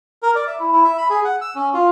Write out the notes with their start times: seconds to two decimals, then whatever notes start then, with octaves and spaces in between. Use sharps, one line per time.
0.23 A#4
0.35 D5
0.47 E5
0.59 E4
0.72 E4
0.84 E5
0.98 B5
1.10 G#4
1.25 F#5
1.41 E6
1.55 C#4
1.74 F4